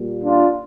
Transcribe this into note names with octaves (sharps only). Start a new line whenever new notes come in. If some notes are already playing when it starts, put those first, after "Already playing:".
Already playing: A#2 G3 A#3
D4 F4